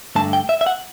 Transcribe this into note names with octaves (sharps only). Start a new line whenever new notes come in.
G2 D3 A3 A5
G5
E5
E5
F#5